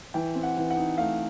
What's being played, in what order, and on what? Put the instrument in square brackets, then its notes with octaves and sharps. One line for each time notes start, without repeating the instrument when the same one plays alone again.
[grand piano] E3 G5
C4
F#5
E3
F#5
D#4
A3 F5